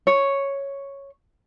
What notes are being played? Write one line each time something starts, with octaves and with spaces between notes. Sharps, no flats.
C#5